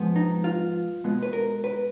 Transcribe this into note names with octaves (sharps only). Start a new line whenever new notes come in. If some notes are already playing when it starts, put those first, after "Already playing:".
Already playing: G#2 F3 G#3 B3
D#4
F4
B2 G#3 B3
B4
A#4
B4